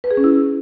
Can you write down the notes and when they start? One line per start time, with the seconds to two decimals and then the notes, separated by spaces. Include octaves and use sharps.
0.04 B4
0.11 G#4
0.17 C#4
0.24 E4